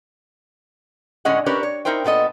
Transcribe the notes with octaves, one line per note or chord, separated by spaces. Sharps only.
A2 D3 G#3 C#4 D#5 F#5
C#4 D4 G4 A#4 B4 C#5
C#5
D#4 E4 A#4 C5 G5
A#2 B3 A4 D#5